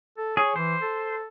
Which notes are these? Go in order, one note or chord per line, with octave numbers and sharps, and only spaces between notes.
A4
G#4 C#5
E3 C5
A4